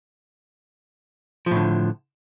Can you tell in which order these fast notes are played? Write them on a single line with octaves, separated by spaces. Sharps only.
F3 A2 D3